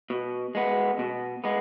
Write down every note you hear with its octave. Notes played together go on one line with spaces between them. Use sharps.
B2
G#3 B3
B2
G#3 B3